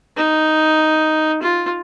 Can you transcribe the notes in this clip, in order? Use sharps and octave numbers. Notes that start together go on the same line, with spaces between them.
D#4
F4